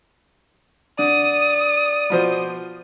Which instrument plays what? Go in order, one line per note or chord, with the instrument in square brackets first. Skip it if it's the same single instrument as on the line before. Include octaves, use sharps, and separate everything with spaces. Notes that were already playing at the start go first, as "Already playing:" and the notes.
[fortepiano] D3 [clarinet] D5 [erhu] D#6
[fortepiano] B2 F3 C5